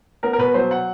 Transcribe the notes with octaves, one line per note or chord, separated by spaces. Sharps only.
B3 A#4
A#4
B2 B4
F#3 C5
F#5